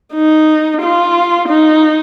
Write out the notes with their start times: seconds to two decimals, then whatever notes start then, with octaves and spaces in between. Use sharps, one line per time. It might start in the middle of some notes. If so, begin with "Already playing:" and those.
0.14 D#4
0.82 F4
1.48 D#4